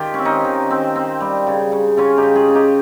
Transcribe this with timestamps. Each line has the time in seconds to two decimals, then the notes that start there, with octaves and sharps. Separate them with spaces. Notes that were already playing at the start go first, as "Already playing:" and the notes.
Already playing: D#3 F4 G4
0.14 C4 C#4
0.25 D#4
0.45 D#3
0.70 C4
0.96 C4
1.20 G3
1.47 C#3
1.72 C#3
1.97 C#3 C#4 F4
2.17 D#4 G4
2.23 C#3
2.36 F4 G#4
2.48 C#3
2.55 D#4 G4